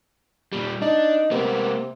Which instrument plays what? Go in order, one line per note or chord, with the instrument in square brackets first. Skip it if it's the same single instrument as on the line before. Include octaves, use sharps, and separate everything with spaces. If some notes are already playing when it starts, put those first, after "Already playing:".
[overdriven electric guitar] A#2 G3
[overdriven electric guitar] D4 [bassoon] D#4
[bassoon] C3 [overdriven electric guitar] A#3 B3